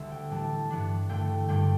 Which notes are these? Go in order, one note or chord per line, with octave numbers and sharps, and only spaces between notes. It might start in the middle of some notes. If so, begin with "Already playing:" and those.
Already playing: D2 D3 G3 E5
G5
A2 E3 G3 A5
G2 E3 B3 D4
G2 D3 A3 G5
G2 D3 G3 G5